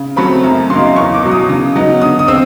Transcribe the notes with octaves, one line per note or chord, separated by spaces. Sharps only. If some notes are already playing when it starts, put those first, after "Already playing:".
Already playing: C#3
F#3 A3 C4 B5
F#2 A#5
C#3 F#3 A#3 D#4 C6
E2 C#6
D6
B2 F#3
D#6
C#3
F#3 B3 D#4
D3 D#6
D#6
C4 E6